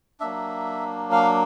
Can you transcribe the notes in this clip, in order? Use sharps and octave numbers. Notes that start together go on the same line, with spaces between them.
F#3 A#3 D4 E5
F5